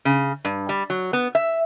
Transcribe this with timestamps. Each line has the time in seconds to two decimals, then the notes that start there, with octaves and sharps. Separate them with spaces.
0.05 C#3
0.45 G2
0.69 G3
0.90 F#3
1.13 B3
1.35 E5